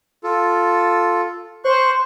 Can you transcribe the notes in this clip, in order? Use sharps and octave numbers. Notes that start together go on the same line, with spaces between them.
F4 A4
C5 C6 C#6 F#6